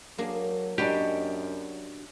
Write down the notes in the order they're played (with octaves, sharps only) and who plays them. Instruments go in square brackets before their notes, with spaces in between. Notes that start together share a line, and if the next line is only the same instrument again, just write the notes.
[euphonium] F#3 [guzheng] A#3 D4 G#4
[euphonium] F#2 [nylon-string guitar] D4 F#4 [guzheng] D#4 B4 [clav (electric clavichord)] G4